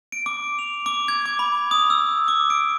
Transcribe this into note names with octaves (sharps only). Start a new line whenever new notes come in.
D7
D6
F7
D6
G#6
D6
B5
D#6
E6
D6
D7